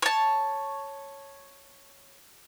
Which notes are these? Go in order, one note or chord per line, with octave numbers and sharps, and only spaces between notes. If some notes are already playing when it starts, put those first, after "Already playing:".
C#5 A5